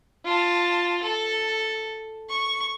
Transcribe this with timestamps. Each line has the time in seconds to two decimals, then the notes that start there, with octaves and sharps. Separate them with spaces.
0.25 F4 A5
1.03 A4
2.29 C#6